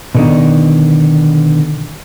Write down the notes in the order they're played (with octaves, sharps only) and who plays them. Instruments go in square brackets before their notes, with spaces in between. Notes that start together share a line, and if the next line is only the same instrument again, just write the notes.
[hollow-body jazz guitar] B2 D3 D#3